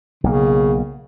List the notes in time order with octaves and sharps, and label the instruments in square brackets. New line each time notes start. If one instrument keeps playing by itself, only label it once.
[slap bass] B1 A#3 [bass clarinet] C#3